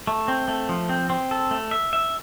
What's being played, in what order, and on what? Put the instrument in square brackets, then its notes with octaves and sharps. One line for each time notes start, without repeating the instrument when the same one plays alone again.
[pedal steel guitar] A3
C4
A3
F3
C4
C4
A4
A3
E5
E5